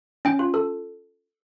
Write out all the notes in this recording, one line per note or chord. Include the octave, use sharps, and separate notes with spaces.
C#4 G5
F4
A4